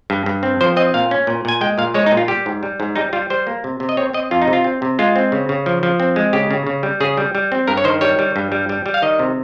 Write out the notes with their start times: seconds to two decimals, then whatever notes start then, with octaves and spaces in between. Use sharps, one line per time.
0.10 G2
0.26 G2
0.43 C4
0.61 F3 C5
0.76 C4 D#5
0.94 A#2 F5
1.11 C#4
1.27 A#2
1.45 A#2 G#5
1.61 G#3 G5
1.78 A#2 F5
1.94 G#3 C#5
2.06 D#4
2.12 A#2
2.17 F4
2.28 G3 G4
2.46 G#2
2.63 G3
2.80 G#2
2.96 G3 D#4
3.13 G3 F4
3.30 G3 C5
3.47 A#3
3.64 C3
3.80 C3
3.89 D#5
3.97 C4 C#5
4.13 C4 D#5
4.31 F2 F4
4.42 D#4
4.48 C3
4.53 F4
4.64 C4
4.82 C3
4.99 G#3 F4
5.16 C4
5.32 C#3
5.49 C#3
5.66 F3
5.83 F3
6.00 C4
6.16 G#3
6.33 C#3 G4
6.51 C#3
6.67 C#3
6.83 G3
7.00 C#3 G#4
7.17 G3
7.35 G3
7.52 C4
7.67 G2 A#4
7.77 C#5
7.84 D#3 C5
8.01 G3 C#5
8.19 G3
8.36 G2
8.52 G3
8.69 G3
8.86 G3
8.94 F5
9.02 D#3 D#5
9.19 C3